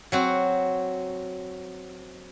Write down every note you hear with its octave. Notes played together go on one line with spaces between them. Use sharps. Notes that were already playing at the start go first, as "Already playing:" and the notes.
F#3 C4 F#4